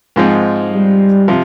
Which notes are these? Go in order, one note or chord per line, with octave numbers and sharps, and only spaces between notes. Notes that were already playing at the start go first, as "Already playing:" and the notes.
G#2 F3 G#3 C4 D#4
G3
C3 F3